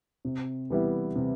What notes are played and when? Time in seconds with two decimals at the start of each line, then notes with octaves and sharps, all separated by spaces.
0.25 C3
0.70 E3 G3 B3 E4
1.16 C3